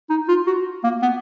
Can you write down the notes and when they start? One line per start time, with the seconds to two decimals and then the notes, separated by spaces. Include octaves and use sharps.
0.10 D#4
0.29 F4
0.47 F#4
0.84 A#3
1.02 B3